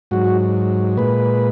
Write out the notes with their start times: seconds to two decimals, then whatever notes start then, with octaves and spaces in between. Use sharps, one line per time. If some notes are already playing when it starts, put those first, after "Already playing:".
0.11 G#2 F#3 F#4
0.97 A#2 G#3 B4